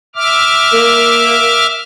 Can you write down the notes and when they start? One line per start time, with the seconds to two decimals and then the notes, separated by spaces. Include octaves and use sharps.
0.16 E5 D6 F6
0.73 A#3